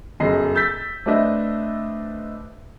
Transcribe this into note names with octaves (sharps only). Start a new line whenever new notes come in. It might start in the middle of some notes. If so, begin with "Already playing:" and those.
G1 F#2 G#4 D#5 C7
E6 G6 A6 B6
A3 C4 D4 B4 D#5 E5